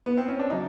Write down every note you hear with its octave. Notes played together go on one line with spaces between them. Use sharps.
B3
C4
C#4
D4
C#3 F#3 D#4